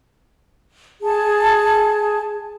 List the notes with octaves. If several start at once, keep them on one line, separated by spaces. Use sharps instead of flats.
G#4 G#5 A5